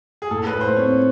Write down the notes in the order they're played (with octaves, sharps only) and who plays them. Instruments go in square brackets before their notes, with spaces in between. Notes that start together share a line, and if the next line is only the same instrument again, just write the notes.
[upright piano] G#4
[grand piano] A2 [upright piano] A4
[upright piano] B4
[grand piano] A2
[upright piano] C5
[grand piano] C4 [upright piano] C#5